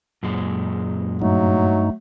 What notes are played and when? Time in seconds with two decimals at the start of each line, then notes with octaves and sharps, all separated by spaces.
0.23 F#2 A#2 G#3
1.22 G2 F#3 A3 D#4